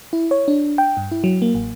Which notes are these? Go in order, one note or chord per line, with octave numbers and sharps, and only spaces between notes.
E4
C#5
D4
G5
G2
E4
F#3
A#3
A1